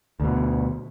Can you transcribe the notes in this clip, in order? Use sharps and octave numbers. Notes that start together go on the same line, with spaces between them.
D2 B2